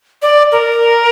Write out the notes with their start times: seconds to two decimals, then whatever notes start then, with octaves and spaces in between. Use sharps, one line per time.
0.22 D5
0.52 A#4